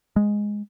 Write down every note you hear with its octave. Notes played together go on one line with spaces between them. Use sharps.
G#3